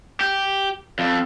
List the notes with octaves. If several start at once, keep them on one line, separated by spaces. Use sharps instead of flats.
G4
F2